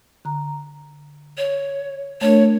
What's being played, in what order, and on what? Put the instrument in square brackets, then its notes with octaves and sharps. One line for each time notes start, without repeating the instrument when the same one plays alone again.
[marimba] D3 A#5
[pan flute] C#5
[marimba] A3 D4 A#4 [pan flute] C#5